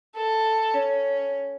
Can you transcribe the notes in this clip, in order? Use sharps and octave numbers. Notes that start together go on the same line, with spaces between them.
A4
C#4